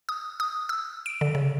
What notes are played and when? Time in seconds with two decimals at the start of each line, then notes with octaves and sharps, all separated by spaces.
0.09 D#6
0.40 D#6
0.69 E6
1.06 D7
1.21 D3
1.35 C#3